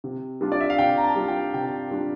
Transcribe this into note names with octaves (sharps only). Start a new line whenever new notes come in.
C3
G3 D4 F4
D5
E5
F5
C3 G5
A#5
A5
G3 D4 F4
G5
C3 G5
G3 D4 F4